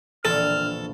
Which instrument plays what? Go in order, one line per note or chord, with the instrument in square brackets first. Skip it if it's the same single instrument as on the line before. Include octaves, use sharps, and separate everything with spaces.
[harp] E1 A#1 A5 [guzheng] D3 A#3 C4 [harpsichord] A4 [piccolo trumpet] F6